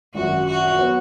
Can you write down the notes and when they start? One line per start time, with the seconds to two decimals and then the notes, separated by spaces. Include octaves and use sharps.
0.14 G#1 F#2 F#3 F#4
0.46 F#4
0.78 F#3 B3 F#4 C#5